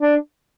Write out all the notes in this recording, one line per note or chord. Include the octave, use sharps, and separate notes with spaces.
D4